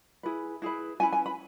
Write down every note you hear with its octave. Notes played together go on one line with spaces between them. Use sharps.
E4 G#4 B4
E4 G#4 B4
C#4 E4 B4 G#5
G#5
B5